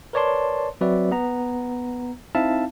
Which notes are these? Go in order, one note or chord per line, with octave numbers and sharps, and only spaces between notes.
A#4 B4 C#5 D5 A5 C6
F#3 C4 F#4 B4 D5 E5
B3 A#5
C4 D#4 E4 E5 F5 A5